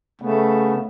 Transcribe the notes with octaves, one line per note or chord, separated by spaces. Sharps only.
C#3 A3 B3